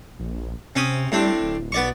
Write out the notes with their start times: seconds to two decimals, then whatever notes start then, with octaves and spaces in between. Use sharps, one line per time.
0.19 A#1
0.76 C3 C4 C#4 D#6
1.12 A2 G3 C4 D4
1.41 D1
1.72 B1 B3 D5 C#6